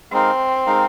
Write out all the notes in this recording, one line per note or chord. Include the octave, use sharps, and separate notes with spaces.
G#3 C4 D#4 A#4 F5
G#3 D#4 A#4 F5